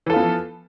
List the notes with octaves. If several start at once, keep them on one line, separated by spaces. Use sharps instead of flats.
E3 F3 B3 F4 A4